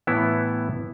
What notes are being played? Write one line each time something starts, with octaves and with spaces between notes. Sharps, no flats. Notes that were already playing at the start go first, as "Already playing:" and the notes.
A2 E3 B3 E4